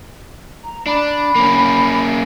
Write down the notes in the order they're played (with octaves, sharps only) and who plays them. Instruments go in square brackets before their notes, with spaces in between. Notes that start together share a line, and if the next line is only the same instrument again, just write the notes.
[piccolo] A#5
[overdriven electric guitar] D4 [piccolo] B5
[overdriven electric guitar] A#3 C#4